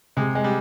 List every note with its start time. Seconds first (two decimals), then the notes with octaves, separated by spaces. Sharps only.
0.17 C3 G#3
0.35 G#3
0.44 G3